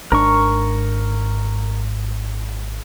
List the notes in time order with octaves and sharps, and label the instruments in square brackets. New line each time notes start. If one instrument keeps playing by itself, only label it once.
[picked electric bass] G#1 G#2 D4 [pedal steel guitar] A#4 C#6